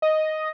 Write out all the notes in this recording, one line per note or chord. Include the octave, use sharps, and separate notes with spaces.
D#5